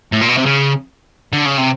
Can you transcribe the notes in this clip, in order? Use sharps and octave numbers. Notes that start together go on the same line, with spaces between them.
A2
A#2
B2
C3
C#3
D3
C#3
C3